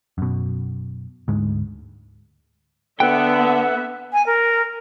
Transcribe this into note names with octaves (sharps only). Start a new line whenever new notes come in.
F#2 B2
D2 G#2 G#3
D3 B3 B4 E5 F#5 G5
G#5
A#4